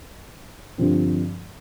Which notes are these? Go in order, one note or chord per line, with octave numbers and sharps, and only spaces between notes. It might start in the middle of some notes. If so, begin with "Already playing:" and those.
G2 D3 F3 C4